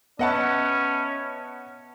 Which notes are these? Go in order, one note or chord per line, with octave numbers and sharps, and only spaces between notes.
B3 C#4 B4 D#5 E5 F#5 A5